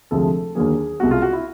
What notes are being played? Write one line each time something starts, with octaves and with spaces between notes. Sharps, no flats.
D2 C3 F3 G#3 A4
D#2 D3 F#3 A#3 G#4
C2 B2 G#3 F#4
F4
F#4
E4